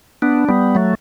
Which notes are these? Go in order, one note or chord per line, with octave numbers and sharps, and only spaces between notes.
B3 D4
G3 B3
F#3 A3